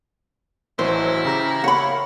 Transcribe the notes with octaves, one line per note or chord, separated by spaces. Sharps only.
A1 E3 F#3 E4 C5
C#3 G4 A#5 A#6
C#5 F5 F#5 B5